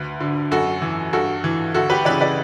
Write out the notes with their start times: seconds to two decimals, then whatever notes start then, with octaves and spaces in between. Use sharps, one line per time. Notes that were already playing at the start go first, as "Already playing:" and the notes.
Already playing: D2 B4
0.20 D3
0.51 F#2 F#4 A4
0.82 E3
1.13 G2 F#4 A4
1.44 E3
1.74 D2 F#4 A4
1.90 G4 B4
2.05 C#3 E3 B4 D5
2.21 B4 D5